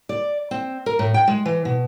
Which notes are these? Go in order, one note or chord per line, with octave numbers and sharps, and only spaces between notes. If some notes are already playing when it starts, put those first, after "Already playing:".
D5
C4
A#4
A2
G5
G#3
E3
B2